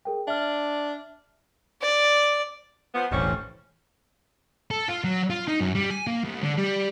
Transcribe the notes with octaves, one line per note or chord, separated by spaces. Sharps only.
G#4 A#4 G5
D4 E5 F6
D5
F3 B3
E1 A1 G3 C4 C#4
A4
F4
F#3
F4
D#4
F#2
G3
G#5
A#3
C2
D3
G3